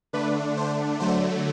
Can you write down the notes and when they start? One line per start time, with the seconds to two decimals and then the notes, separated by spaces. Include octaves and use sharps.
0.13 D3 A3 D4 B4
0.57 C5
1.00 D3 F#3 A3 C5